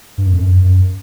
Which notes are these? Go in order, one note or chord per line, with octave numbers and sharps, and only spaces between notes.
G2
F#2
F2
F#2
F#2